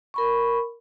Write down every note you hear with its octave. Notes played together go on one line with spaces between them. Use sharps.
A#4 B5 C#6